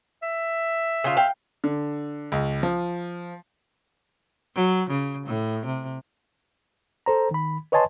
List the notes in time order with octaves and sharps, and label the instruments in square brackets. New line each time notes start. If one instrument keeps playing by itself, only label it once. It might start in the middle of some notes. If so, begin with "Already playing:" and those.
[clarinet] E5
[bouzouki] C#3 F4
F5 G5
[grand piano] D3
C#2
F3
[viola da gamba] F#3
C#3
A2
C3
[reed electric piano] A4 C5 A#5
D#3 B5
B4 C#5 D#5 G#5 A5 C6